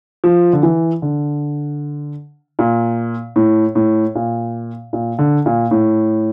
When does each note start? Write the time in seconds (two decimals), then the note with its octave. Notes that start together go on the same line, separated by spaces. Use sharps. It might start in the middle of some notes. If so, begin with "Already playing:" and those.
0.24 F3
0.53 D3
0.63 E3
1.02 D3
2.59 A#2
3.36 A2
3.75 A2
4.15 A#2
4.93 A#2
5.19 D3
5.46 A#2
5.71 A2